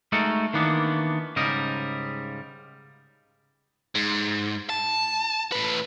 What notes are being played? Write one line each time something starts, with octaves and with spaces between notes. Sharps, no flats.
G#3 A3 D#4 F#4 A4 A#4
D#3 E3 A#3 B3 D4
G#2 C#3 G3 A#4 D#5
G#2
A5
A2 B4